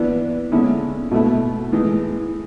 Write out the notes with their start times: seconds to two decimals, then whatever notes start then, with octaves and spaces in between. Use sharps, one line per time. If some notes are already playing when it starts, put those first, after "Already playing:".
Already playing: E3 B3 D4
0.52 D3 G#3 C#4 E4
1.11 B2 A3 E4
1.72 A2 E3 G#3